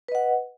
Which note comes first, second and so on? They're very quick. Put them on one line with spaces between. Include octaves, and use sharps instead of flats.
B4 D#5 F#5